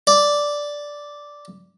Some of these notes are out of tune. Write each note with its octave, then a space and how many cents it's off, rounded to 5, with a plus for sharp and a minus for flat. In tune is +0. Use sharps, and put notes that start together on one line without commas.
D5 -5